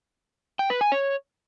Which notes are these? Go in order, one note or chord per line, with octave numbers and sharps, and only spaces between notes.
G5
B4
G#5
C#5